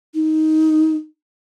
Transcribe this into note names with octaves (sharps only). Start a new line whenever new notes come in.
D#4